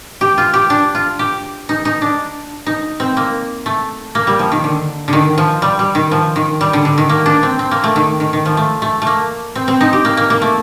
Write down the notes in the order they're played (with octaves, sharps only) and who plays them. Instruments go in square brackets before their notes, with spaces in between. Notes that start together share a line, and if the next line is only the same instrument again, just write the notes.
[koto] G4
F4
G4
D4
F4
G4
D#4
D#4
D4
D#4
C4
A#3
A3
A#3
G3
F3
D#3
D3
D3 D#3
F3
G3
G3
D#3
F3
D#3
G3
D3
D3
D#3
A#3
D4
C4
C4
A#3
A3
D#3
D#3
D#3
F3
A3
A3
A3
A#3
C4
C4
D#4
G4
A#3
A#3
A#3
A3